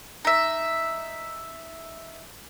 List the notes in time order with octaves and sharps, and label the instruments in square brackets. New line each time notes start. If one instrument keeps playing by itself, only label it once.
[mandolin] D#4 E5